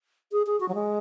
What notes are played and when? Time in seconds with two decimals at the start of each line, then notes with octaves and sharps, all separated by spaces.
0.32 G#4
0.47 G#4
0.60 F#4
0.69 F#3
0.75 G#3